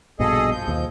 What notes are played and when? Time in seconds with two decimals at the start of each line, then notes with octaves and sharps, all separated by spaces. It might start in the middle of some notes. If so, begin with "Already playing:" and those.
0.19 A#1 G2 B2 G#4 A4 D#5
0.52 F3 G6
0.68 D#2